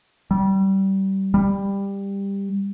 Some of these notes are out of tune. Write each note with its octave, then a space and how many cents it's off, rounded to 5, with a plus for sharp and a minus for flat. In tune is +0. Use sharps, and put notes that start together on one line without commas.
G3 -25
G3 +15